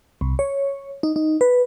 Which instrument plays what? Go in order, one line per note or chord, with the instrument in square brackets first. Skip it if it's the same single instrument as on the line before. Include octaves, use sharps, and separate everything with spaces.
[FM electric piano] C2
C#5
D#4
D#4
B4